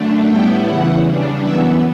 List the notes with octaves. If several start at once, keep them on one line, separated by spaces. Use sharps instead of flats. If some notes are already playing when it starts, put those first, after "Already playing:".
Already playing: F#2 D3 A3 D4
A2 G3 B3 E4 G5
E2 C#3 E3 F#5
C#3 G3 D4
F#2 E3 B3 E5